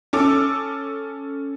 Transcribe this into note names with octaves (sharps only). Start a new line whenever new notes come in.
C#4 A4 D6